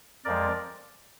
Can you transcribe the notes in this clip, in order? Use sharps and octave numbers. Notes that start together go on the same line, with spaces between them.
F2 F3 G#3 A#4 D5